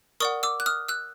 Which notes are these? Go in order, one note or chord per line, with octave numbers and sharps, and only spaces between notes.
A#4 D5 F#5 C#6 D#6
D6 E6
F#6
D#6 F6
E6 F#6